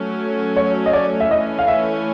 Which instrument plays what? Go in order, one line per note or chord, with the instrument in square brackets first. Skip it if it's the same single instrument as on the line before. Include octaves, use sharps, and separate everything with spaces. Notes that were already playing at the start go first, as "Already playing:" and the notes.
Already playing: [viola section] F#3 A3 C#4
[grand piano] C#5
D#5
D5
E5
[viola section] E3 A3 C#4 [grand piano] D#5
[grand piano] F5
E5